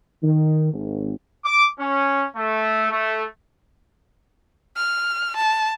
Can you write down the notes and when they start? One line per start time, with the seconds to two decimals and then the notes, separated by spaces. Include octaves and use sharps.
0.23 D#3
0.72 G#1
1.45 D6
1.79 C#4
2.36 A3
2.91 A3
4.76 F6
5.36 A5